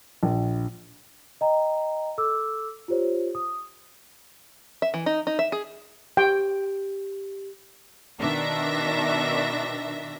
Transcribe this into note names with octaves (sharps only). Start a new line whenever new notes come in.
A#1
D#5 G5 A#5
A4 D6 E6
F4 G4 C5 C#5
D#6
E5
E3
D#4
D#4
E5
G#4
G4 G5
B2 D#3 D4 E5 A#6